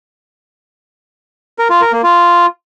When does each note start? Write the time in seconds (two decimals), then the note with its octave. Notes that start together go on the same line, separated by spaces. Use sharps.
1.59 A#4
1.70 F4
1.81 A#4
1.92 A#3
2.04 F4